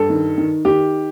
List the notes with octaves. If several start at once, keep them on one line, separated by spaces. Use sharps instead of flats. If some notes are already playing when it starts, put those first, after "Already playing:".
Already playing: G2 A4
D#3
D#3
D#3 G4